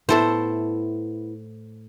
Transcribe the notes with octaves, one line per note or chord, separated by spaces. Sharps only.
A2 B3 E4 A4 C5